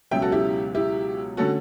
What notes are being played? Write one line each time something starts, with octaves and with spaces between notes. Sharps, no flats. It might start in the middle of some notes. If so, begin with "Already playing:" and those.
C#2 B2 F#3 C#4 E5 G5
F#4 A4
E4 G4
E4 G4
D3 A3 C#4 F#4 A4